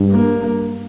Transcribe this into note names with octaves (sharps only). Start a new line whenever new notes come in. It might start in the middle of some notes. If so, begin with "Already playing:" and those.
Already playing: G2
A#3